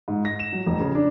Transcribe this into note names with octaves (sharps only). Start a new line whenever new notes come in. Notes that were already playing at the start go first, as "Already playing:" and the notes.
G#2
A#6
E7
F#3
F1
C#3
D4